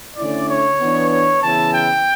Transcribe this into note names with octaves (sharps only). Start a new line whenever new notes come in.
D3 A3 C#4 E4 D5
C#5
E3 B3 D4
C#5
C#3 E3 B3 E4 A5
G5